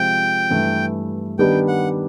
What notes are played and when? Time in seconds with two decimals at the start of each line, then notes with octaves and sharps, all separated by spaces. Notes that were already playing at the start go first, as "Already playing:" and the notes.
Already playing: C3 F3 G#3 C4 F4 G5
0.50 G2 E3 A3
1.39 D#3 G3 B3 D4 G4 G5
1.68 F#5